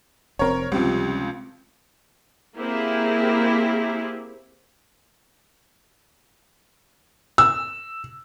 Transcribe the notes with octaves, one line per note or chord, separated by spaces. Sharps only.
F1 C4 A#4 C#5
C#2 C3 F3 G3
A#3 C4 E4 G4 G#4
E6